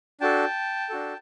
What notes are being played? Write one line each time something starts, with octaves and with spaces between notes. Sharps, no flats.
D4 F#4 A4 G5 A5
D4 F#4 A4